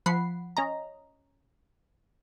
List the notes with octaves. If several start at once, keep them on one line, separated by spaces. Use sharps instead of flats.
F3 F#5 B5 C7
C#4 D#5 A#5